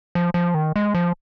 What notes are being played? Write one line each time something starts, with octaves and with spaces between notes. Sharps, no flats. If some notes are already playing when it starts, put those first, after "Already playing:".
F3
F3
D#3
G#3
F3